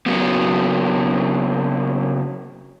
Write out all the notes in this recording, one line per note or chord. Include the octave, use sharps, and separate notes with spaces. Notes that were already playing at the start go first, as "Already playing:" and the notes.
C#3 F#3 A#3 B3